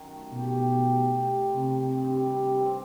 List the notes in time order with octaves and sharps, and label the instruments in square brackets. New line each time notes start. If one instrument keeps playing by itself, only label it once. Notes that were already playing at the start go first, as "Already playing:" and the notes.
Already playing: [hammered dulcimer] F#2 D#3
A3
[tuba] B2 [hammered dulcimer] G4
[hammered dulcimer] G4
G4
A3
G4
C4
[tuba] C3 [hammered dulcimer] D#3
[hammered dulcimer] D#3
G2
G3
G3
C4